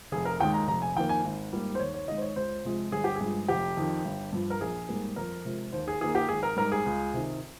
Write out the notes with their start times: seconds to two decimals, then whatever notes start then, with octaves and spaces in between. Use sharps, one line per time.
0.12 F1 G#4
0.25 A#4
0.40 D#2 D#3 G#3 G5
0.54 A#5
0.68 F1 A#5
0.82 G#5
0.95 F2 D#3 A#3 G5
1.09 G#5
1.24 G#1
1.53 G#2 G3 A#3
1.75 C5
1.80 D#2 C#5
1.94 C#5
2.08 D#3 G#3 D#5
2.17 C5
2.22 C#5
2.36 C#2 C5
2.64 C3 F3 G#3
2.92 G1 G#4
3.04 G4
3.16 G#4
3.21 G2 F3 G#3
3.48 F1 G4
3.77 F2 D#3
4.05 G1
4.33 G2 F3
4.50 A#4
4.61 A#1 G#4
4.88 G#2 G3 A#3
5.16 F2 A#4
5.45 C3 F3 G#3
5.73 D#2 C5
5.88 G#4
6.01 D#3 A#3 G#4
6.15 G4
6.29 G#1 G#4
6.43 A#4
6.57 G#2 G3 A#4
6.72 G#4
6.86 C#2
7.13 C3 D#3